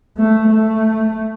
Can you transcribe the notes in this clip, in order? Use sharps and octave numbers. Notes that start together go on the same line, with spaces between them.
A3
A3